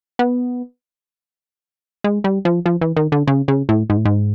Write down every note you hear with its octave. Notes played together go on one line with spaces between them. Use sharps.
B3
G#3
G3
F3
F3
E3
D#3
D3
C#3
C#3
A2
G#2
A2
G#2